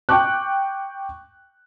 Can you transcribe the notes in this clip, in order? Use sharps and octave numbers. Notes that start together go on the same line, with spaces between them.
G5 C#6 D6 F#6